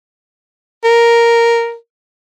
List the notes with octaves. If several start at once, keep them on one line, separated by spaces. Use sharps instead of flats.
A#4